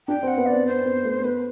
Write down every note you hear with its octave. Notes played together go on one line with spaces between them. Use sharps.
D4 G5
C4
F#5
B3
D5
C4
C4 C5
B3
A3
B3 B4